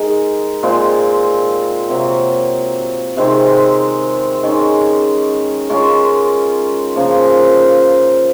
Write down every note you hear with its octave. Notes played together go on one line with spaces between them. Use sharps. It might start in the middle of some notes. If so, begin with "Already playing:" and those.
Already playing: G#3 D#4 A#4
A#2 G#3 C4 F4
C3 F#3 A#3
C3 D#3 G#3 C4
D#3 G#3 C#4
G#3 C#4 F4 A#4
C#3 F3 A#3